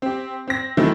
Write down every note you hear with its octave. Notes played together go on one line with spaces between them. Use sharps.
C4 G4
C4 A#6
D#3 E3 F#3 A3 C4 E4